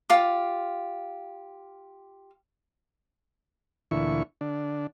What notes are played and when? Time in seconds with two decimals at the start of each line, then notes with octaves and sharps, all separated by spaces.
0.10 F4 G4 F5 D6
3.91 D2 A#2 D3 E3 E4 C#6
4.41 D3 D4